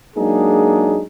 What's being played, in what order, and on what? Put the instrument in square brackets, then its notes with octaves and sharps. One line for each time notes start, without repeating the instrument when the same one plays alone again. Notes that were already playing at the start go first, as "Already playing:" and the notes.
[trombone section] F#3 G#3 A#3 D4 D#4 G#4